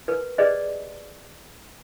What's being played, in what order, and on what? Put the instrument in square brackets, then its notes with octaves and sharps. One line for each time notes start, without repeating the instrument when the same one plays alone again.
[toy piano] A#4 B4
G4 G#4 B4 C5 D5 D#5